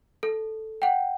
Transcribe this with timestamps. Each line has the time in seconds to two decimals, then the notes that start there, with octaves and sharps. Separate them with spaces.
0.23 A4
0.82 F#5 G5